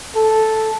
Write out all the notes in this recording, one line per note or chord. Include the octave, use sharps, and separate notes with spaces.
A4